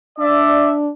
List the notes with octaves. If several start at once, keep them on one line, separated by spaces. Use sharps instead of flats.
D4 D5 E5